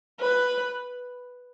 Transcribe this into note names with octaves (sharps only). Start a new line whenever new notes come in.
B4